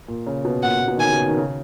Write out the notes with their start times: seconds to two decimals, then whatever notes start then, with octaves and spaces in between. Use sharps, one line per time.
0.08 A#2
0.27 C#3
0.45 B2
0.63 A#2 F#5
0.81 A#2
0.88 B2
0.97 D#3
1.00 C#3 G#5
1.12 B2
1.28 D#3
1.37 C#3